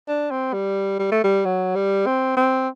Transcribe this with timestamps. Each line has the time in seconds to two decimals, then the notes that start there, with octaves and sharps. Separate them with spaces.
0.08 D4
0.31 C4
0.53 G3
0.99 G3
1.12 A3
1.24 G3
1.45 F#3
1.76 G3
2.06 C4
2.37 C4